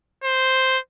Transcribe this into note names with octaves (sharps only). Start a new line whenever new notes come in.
C5